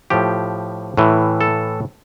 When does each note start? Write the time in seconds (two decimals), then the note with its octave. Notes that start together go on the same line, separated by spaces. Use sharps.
0.10 A2 F3 G4
0.97 A2 E3
1.41 A4